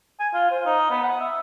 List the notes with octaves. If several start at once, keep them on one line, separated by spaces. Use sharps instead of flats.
G#5
F4
C5
D#4
B3
F#5
E5